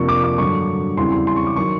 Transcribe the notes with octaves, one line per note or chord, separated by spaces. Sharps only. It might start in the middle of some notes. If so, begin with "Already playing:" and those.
Already playing: F2 C3 F3 A#3 D4 C#6
D6
D6
G2 D3 F#3 C#6
E2 C#3 E3 G3 C4 C6
C6
C6
C#6
D6
D#3 F#3 C#6